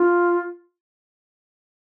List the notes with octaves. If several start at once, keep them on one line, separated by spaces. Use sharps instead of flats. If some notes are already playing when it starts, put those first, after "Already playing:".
Already playing: F4